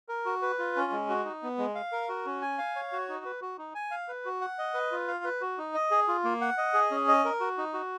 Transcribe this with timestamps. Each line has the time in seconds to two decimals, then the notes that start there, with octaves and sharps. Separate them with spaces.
0.09 A#4
0.26 F#4
0.42 B4
0.59 F4
0.76 C#4
0.92 G#3
1.09 F#4
1.25 D#4
1.43 B3
1.58 G#3
1.75 F5
1.92 A#4
2.09 F#4
2.26 C#4
2.41 G#5
2.58 F5
2.76 C#5
2.92 F#4
3.09 D#4
3.25 B4
3.42 F#4
3.58 D#4
3.75 G#5
3.91 F5
4.08 B4
4.25 F#4
4.41 F#5
4.58 D#5
4.74 B4
4.92 F4
5.07 F5
5.24 B4
5.41 F#4
5.58 D#4
5.74 D#5
5.91 G#4
6.08 F4
6.24 A#3
6.41 F#5
6.58 D#5
6.74 G#4
6.91 C#4
7.08 D#5
7.25 A#4
7.40 F#4
7.58 D#4
7.74 F#4